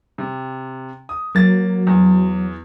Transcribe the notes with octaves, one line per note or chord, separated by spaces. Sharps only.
C3
D#6
F#3 A#3 A6
E2